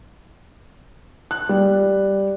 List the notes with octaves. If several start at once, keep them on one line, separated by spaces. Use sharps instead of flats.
F#6
G3